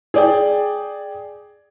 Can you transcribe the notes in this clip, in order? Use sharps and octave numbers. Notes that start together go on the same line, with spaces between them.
G#4 D5 G5